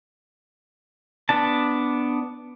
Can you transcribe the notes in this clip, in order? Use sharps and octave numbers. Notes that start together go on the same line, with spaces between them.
B3 D4 A5